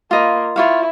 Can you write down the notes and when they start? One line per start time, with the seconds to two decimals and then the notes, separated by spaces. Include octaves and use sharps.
0.11 A#3 F4 D#5 B5
0.56 E4 F4 C#5 F5